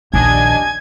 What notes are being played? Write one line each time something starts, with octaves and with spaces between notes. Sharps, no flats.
A#1 D#2 D4 D#5 G#5 G#6